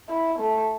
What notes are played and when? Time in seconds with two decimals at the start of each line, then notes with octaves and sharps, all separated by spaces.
0.09 E4
0.39 A3